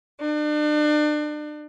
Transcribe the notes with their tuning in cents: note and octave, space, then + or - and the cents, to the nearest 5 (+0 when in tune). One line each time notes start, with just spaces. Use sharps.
D4 +35